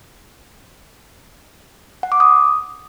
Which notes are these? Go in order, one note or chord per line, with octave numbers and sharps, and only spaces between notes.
F#5
D6
D#6